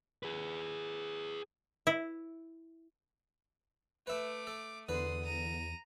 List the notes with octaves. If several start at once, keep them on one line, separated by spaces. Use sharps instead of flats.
G#4 B4
E4
A3 B4 E5 D6
A4
E2 D3 B4 C6 D#6
A#5 D#7